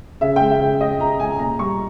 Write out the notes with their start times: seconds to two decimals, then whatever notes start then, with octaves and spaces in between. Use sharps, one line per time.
0.21 C#3 E5
0.36 G#3 G5
0.51 E5
0.60 C#3
0.80 G#3 D#5
1.00 C#3 A#5
1.19 G#3 G#5
1.39 A#2 A#5
1.59 G3 C#6